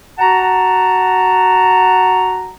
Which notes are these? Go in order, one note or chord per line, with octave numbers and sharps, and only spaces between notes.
F#4 F#5 A5 A#5